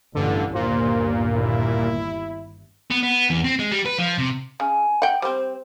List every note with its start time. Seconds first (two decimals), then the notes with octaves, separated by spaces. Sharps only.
0.15 A1 G2 B2 D3 E3
0.54 G1 D#2 A#2 C5
1.34 E4
2.90 B3
3.03 B3
3.30 E2
3.44 C4
3.59 G#3
3.72 G3
3.86 B4
3.98 F3
4.18 C3
4.60 C#3 G#5
5.02 F#5 G5
5.22 G3 C4 C5